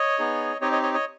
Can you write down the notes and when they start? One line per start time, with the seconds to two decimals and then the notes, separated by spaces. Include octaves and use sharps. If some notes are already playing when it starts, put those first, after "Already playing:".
Already playing: C#5 D#5
0.19 B3 D#4 G#4
0.61 C4 D#4 G4 C#5 D#5
0.72 C#5 D#5
0.83 C#5 D#5
0.94 C#5 D#5